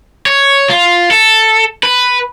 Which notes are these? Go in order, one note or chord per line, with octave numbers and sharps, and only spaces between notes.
C#5
F4
A4
B4